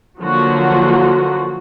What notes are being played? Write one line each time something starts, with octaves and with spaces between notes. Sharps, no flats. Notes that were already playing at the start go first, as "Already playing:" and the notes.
D3 F3 F#3 A#3 F#4